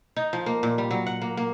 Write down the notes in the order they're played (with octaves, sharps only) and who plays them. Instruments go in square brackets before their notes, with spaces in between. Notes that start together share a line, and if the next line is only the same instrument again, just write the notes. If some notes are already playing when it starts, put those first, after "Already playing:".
[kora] D#4
F3
A#3
A#2
G3
F#3
F#5
A#3
A#3